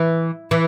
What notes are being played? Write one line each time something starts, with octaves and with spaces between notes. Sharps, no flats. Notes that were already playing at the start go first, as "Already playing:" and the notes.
Already playing: E3
E3